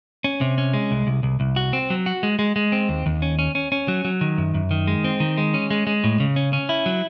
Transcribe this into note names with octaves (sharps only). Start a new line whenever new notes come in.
C#4
C3
C#4
G#3
C2
C2
C2
C2
F#4
C4
F#3
F#4
G#3
G#3
G#3
C4
D#2
D#2
C#4
C#4
C#4
C#4
F#3
F#3
D#3
F#2
F#2
D#3
G#3
C4
D#3
G#3
C#4
G#3
G#3
A2
C#3
C#4
C#4
E4
F#3